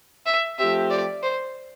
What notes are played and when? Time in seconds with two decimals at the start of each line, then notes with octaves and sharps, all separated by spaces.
0.26 E5
0.59 F3 A3 C4 G4 E5
0.90 D5
1.23 C5